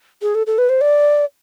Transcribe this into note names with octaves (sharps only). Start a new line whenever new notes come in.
G#4
A4
A4
B4
C5
D5